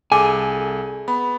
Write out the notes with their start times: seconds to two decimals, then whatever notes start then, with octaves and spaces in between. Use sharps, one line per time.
0.12 C2 G#4 A4 G#5 D6
1.08 B3 B5